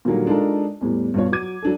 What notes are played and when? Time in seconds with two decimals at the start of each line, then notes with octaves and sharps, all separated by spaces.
0.05 A#2 D3 D#3 F#3 G3 A#3
0.26 G#3 D4 D#4 F4 A4 A#4
0.81 E2 A2 G3
1.14 G2 B2 F4 C#5
1.32 F#3 D6 G#6 D#7
1.62 F#3 D4 A4